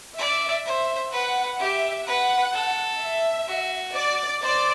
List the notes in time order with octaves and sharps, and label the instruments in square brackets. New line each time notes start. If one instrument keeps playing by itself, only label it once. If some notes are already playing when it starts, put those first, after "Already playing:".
[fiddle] D5 [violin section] E5
[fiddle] C5 [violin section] E5
[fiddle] B4 [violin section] F#5
[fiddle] G4 [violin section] E5
[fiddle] B4 [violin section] F#5
[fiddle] A4
[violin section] E5
[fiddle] F#4
[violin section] D5
[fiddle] C5 [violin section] D5